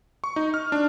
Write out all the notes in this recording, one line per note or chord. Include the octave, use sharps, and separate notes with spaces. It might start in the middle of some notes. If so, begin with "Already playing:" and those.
C#6
D#4
F6
D4